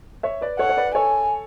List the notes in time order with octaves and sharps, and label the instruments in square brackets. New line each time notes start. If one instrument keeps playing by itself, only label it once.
[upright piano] C#5 E5
B4 D5
[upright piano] A4 C#5 [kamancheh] F#5
[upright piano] C#5
B4 D5
[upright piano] A4 C#5 [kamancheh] G#5